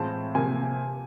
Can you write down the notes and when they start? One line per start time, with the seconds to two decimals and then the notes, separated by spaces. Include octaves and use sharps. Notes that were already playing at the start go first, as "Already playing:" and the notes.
Already playing: A2 E3 G#3 C4 F4 A5
0.35 C3 F3 A#3 G#5